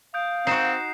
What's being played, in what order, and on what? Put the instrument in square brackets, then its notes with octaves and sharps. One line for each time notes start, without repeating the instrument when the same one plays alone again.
[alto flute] F5 [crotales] D#6 G6 D7
[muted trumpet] C4 [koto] D#4 F#4 [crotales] C7 E7